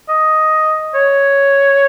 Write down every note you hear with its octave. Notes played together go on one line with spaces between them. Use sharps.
D#5
C#5